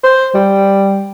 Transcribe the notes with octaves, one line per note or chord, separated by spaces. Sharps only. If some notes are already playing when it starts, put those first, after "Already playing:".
C5
G3